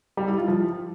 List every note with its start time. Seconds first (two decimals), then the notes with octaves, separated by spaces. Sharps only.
0.17 G3
0.28 E4
0.38 F4
0.48 F3